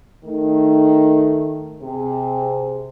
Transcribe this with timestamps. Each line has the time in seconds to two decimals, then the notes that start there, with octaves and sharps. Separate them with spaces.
0.23 D#3 A3
1.81 C3 G#4